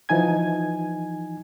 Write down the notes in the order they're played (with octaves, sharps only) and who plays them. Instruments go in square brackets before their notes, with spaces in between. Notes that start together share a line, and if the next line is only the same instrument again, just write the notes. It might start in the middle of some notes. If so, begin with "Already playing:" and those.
[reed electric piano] E3 F3 D#4 G#5 G#6